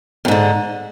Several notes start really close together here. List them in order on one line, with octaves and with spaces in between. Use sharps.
F2 G#2 D3